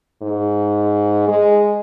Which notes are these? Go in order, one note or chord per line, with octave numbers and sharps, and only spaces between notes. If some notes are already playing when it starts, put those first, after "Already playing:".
G#2
G#3